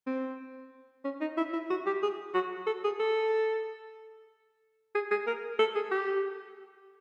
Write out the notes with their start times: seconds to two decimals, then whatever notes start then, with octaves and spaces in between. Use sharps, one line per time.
0.07 C4
1.04 C#4
1.21 D#4
1.37 E4
1.53 E4
1.70 F#4
1.86 G4
2.02 G#4
2.34 F#4
2.67 A4
2.84 G#4
2.99 A4
4.95 G#4
5.11 G#4
5.27 A#4
5.59 A4
5.75 G#4
5.91 G4